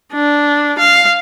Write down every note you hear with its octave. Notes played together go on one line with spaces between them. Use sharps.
D4
F5